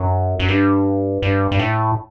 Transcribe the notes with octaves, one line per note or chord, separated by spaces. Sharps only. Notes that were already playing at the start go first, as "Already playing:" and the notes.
Already playing: F#2
F#2
G2
G2
G2
A2